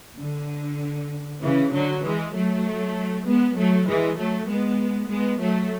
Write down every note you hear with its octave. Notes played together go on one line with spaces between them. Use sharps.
D3
C#3 E3
D3 F#3
E3 G#3
F#3 A3
G#3 B3
F#3 A3
E3 G#3
F#3 A3
G#3 B3
G#3 B3
F#3 A3